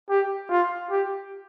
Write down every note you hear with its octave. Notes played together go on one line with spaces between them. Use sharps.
G4
F4
G4